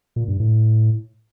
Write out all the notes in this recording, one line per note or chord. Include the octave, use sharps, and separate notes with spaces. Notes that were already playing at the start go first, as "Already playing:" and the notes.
A#2
G2
A2